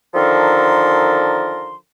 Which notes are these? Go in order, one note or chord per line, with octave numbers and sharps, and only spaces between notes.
D3 D#3 F3 A4 A#4 C6